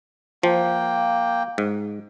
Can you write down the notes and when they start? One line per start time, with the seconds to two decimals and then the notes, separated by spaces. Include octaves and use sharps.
0.43 F3 A#3 G5
1.58 G#2